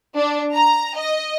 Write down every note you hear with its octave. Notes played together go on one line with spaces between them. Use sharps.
D4
A#5
D#5